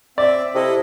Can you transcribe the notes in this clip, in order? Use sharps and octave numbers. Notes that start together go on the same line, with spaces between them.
C4 D5 E5
C3 E4 A4 D#5